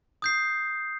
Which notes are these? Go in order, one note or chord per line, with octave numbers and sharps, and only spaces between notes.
D#6 G6 C7